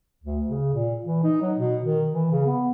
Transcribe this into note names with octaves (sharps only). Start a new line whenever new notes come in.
D2
C#3
A#2
E3
D#4
F#3
B2
D#3
E3
C#3
B3